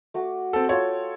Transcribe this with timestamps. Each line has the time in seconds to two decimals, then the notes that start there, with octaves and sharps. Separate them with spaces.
0.14 A3 F#4 D6
0.53 C4 A4
0.69 F4 A4 C#5 G5